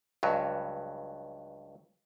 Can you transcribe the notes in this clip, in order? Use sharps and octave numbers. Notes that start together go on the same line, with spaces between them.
C#2 G2 F#3